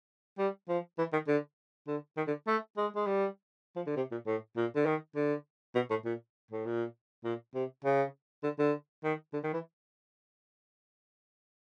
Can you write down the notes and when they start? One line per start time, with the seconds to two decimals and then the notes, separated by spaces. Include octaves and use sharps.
0.38 G3
0.69 F3
0.98 E3
1.13 D#3
1.28 D3
1.87 D3
2.17 D#3
2.27 D3
2.47 A3
2.77 G#3
2.96 G#3
3.07 G3
3.76 F3
3.87 D3
3.97 C3
4.11 A#2
4.26 A2
4.56 A#2
4.76 D3
4.86 D#3
5.15 D3
5.75 B2
5.90 A2
6.05 A#2
6.51 A2
6.65 A#2
7.24 A#2
7.54 C3
7.85 C#3
8.43 D3
8.59 D3
9.04 D#3
9.33 D3
9.43 D#3
9.54 E3